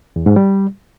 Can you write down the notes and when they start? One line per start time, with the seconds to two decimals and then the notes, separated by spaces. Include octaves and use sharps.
0.16 E2
0.26 G#2
0.36 G3